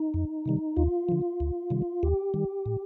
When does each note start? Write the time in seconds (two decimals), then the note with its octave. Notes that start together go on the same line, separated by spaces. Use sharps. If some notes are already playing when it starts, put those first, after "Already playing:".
Already playing: D#4
0.14 F2
0.46 C3 D#3 G3
0.77 D#2 F4
1.09 D3 F3
1.40 D2
1.70 C3 D#3 G3
2.03 D#2 G4
2.34 D#3 G3
2.66 A2